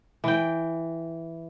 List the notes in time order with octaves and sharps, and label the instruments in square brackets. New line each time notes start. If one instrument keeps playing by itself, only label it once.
[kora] E3 G5